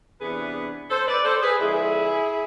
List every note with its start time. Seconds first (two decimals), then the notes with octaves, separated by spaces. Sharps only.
0.20 E2 C3 E3 B3 D4 G#4 B4
0.90 A4 C5
1.07 B4 D5
1.24 A4 C5
1.42 G#4 B4
1.59 F2 D3 G#3 E4 G#4